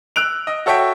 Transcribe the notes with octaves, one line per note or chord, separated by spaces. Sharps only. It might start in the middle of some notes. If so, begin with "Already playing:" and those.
E6 F#6 D7 F7
D#5
F#4 A4 C#5 E5 G5